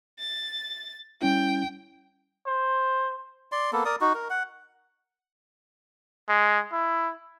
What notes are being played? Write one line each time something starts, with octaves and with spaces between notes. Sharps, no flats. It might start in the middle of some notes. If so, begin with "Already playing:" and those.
A6
G3 C#4 E4 G5
C5
D5 C6
A#3 B3 A4
A#4 D5 D#6
D#4 F#4
A#4
F#5
G#3
E4